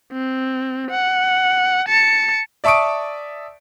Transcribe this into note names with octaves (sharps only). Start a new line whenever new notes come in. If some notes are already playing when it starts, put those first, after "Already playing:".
C4
F#5
A5 C#7
D5 E5 A5 C#6 D#6 D7